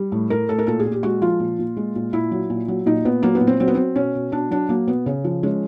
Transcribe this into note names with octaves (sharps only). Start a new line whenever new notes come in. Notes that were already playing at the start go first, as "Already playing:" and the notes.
Already playing: G3
A2
A2 A#4
A2 A4
A#4
A#2 A4
G#4
A#2
G4
G#3 F#4
F3 F4
A#2
A#2
G#3
A#2
A#2 E4
F#3
A#2
F#3
A#2 D#4
A#2 B3
F#3 A#3
B3
A#2
C4
F#3 C4
B3
F#3 C4
B2 C#4
B2
B2 D4
F#3 D4
F#3 A#3
B2 B3
C#3
F3
G#3 C#4